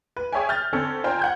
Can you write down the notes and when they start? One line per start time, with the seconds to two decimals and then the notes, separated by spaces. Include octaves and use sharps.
0.17 B4
0.33 G#4 C#5 E5 G5 G#5
0.49 F6 G6 A6
0.72 D3 C4 C#4 A4
1.04 F4 C5 G5 G#5 A#5
1.19 F#5 G6 G#6